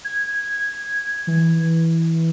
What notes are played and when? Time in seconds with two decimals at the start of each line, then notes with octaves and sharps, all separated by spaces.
0.04 G#6
1.27 E3